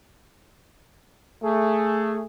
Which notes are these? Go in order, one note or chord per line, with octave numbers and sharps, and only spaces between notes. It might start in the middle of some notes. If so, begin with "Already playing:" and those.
A3 G#4